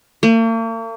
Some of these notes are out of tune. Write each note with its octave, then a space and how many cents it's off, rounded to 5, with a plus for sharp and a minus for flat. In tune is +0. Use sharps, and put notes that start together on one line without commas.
A#3 -45